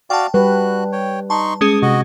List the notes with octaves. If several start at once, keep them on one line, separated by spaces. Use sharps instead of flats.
F#4 D5 F5 G5 A5
G3 F#4 B4 F#6
C#5 G5
D#4 A5 C6 C#6
G#3 C#4 G#4 D#6
C3 F#4 D#5